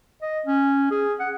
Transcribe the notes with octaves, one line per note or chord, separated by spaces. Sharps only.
D#5
C#4
G#4
F#5